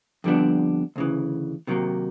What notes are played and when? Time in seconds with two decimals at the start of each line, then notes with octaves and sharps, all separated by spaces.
0.24 F2 D3 G3 B3 D4
0.96 D2 C#3 E3
1.67 C3 D#3 F#3 A#3